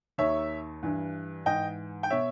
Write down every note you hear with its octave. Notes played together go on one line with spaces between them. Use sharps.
D#2 D#3 C#5 E5
G2 E3
G#2 E3 D#5 G5
G5
B2 C#5 E5